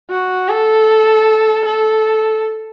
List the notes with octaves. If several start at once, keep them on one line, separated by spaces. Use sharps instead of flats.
F#4
A4
A4